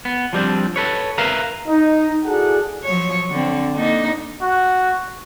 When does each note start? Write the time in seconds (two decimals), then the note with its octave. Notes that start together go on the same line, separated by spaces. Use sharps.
0.05 B3
0.33 F3 G3 C4 D4
0.76 A4 B4 C#5
1.18 A#4 B4 E5 F5 A#5
1.68 D#4
2.25 E4 F#4 G#4 A4 D5 F#5
2.84 F3 F#3 C#5
3.30 D3 C4
3.74 D3 A#3 D#4
4.42 F#4